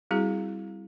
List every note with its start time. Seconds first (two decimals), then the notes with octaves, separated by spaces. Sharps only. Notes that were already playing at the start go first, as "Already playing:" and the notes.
0.11 G3 C4 E4 F#4 G#4